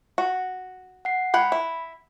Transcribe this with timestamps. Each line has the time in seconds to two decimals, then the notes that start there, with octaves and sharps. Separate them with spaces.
0.18 F#4
1.05 F#5 C7
1.34 G#3 F#5 G5 B5
1.52 E4